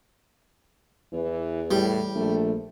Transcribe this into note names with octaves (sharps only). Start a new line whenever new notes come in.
E2 E3
A2 G3
A#1 A3